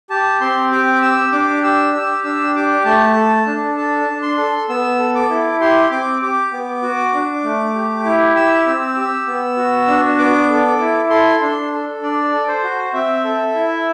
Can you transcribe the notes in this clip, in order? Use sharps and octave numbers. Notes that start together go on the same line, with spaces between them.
G4 A5
C4 C6
G4 D6
G4 E6
D4 D6
G4 E6
G4 E6
D4 E6
G4 D6
A3 A5
A4
D4
A4 A5
D4
C6
A4
B3 E6
A4
D6
E4
G4 C6
C4 D6
G4 D6
B3
F#4
D4
A3
G4
E4
G4 E6
C4
G4
B3
F#4
D4
B3 D6
A4
E4
A4 C6
D4 C6
A4
D4 D5
A4
C5
F#4
C4 E5
A4
E4